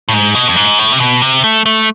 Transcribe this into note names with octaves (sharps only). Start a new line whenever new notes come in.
A2
G#2
B2
F2
G#2
A2
C3
B2
C3
A3
A3